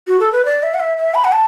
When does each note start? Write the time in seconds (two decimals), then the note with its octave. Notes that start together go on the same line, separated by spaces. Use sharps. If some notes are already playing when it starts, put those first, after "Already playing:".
0.07 F#4
0.20 A4
0.32 B4
0.45 D5
0.63 E5
0.74 F#5
0.80 E5
0.98 E5
1.15 B5
1.25 F#5
1.32 A5